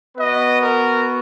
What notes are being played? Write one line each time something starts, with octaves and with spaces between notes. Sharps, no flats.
B3 F#4 B4 D#5
A#4